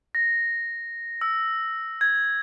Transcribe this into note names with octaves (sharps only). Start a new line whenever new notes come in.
A#6
E6
G#6